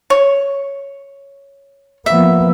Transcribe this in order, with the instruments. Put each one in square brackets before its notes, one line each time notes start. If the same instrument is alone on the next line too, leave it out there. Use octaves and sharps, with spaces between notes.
[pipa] C#5
[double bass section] F3 A#3 B3 [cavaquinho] E5